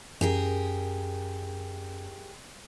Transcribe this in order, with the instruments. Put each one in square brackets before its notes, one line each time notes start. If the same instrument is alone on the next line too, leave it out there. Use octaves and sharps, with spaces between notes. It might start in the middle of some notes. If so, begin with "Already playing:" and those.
[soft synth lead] F#2 [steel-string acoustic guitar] G4 G#4 A#4